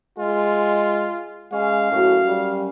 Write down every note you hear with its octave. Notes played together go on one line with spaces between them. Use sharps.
G#3 F4
G#3 C#4 F5
F#2 A2 F#4
G3